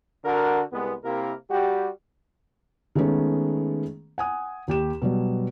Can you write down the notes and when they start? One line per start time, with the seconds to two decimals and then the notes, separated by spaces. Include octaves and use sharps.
0.24 D3 F#4 A#4
0.73 C2 G#3 B3
1.04 C3 A#3 E4 A#4
1.50 G3 F#4 G4
2.95 D#3 G#3 A3 B3 C#4
4.18 F#5 G#5 D#6
4.68 D#2 G4 E7
5.02 B2 F#3 G3